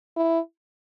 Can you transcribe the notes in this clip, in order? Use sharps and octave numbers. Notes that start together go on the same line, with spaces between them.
E4